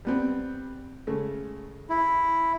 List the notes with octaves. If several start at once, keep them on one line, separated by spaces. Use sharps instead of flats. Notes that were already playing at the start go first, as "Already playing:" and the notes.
G3 B3 C4
C#3 G#3 A3
E4